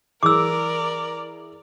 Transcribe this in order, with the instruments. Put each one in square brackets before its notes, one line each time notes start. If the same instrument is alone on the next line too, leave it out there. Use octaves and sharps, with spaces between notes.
[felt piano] E3 G#4 [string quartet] A#4 D5 [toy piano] D6 E6